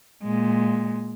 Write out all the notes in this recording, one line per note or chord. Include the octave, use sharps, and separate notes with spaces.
A#2 G#3